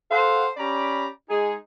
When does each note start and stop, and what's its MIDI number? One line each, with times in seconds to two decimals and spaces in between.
0.11 0.47 69
0.11 0.47 72
0.11 0.47 77
0.11 0.47 78
0.57 1.06 61
0.57 1.06 67
0.57 1.06 74
0.57 1.06 82
0.57 1.06 83
1.30 1.54 56
1.30 1.54 63
1.30 1.54 68